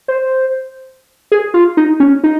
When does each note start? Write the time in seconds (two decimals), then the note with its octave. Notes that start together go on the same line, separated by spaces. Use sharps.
0.08 C5
1.32 G#4
1.54 F4
1.77 D#4
2.00 C#4
2.24 D#4